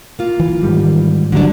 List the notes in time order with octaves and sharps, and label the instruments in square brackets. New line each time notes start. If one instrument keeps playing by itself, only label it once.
[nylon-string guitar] A#3 F4
[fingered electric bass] E3
G#2 D#3 G3
[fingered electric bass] A1 D2 G3 [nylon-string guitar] D3 F#3 D4